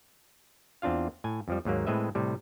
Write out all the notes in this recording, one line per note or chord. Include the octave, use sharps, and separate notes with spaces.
E2 C4 D4 F4 F5
A2 G#5
F2 F3 G3
D#2 G#2 F#3 A#3
A2 G#3 C4 B4 D#5 E5
A2 C3 G3